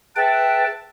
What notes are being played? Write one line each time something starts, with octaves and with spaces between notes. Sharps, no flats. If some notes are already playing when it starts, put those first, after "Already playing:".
G#4 B4 E5 F#5 G5 A5